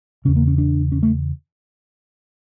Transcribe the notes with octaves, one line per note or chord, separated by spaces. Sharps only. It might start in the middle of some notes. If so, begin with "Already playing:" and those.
E2 C#3 C#4
A#3
C#4
D4
C#4
A3